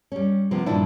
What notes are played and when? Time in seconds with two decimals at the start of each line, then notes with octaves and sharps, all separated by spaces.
0.12 G3 C#4
0.51 C3 F3 A#3 B3
0.66 G2 A#2 D#3 F3 D4 E4